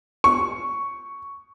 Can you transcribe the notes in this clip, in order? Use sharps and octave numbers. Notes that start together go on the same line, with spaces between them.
C#6